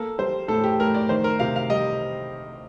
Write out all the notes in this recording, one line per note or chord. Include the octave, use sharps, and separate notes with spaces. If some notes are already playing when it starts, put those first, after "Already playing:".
Already playing: A#3 A4
G3 C5
A2 A4
G4
A2 A#4
D5
D#3 C5
A#4
C3 F5
F5
G3 D#5